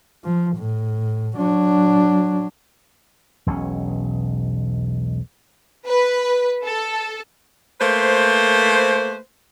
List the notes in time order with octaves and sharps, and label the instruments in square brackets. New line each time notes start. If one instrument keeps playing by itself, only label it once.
[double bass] F3
A2
F#3 D4
[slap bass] E1 B1 B2 C#4
[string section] B4
A4
[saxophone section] A3 A#3 B4 C5